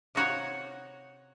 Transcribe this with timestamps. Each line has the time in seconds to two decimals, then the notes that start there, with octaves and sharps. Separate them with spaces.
0.15 C3 D#4 F4 F#4 C#5 G#5